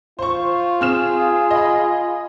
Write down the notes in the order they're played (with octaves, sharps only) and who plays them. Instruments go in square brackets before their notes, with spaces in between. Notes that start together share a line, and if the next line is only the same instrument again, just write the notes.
[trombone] F4 [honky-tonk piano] C5 C#6
[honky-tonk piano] C4 F6 E7 [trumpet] G#4
[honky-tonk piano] D#5 B5